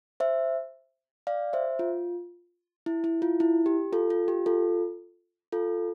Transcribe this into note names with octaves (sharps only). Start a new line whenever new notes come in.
C5 E5
D5 F5
C5 E5
F4
E4
E4
F4
E4
G4
F4 A4
F4
G4
F4 A4
F4 A4